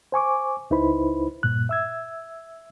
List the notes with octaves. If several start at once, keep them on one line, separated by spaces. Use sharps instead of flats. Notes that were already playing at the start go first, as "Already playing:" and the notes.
C5 G#5 C#6 D6
C#2 D#4 E4 B4 C5 B5
G2 A#2 F#6
E5 E6 G#6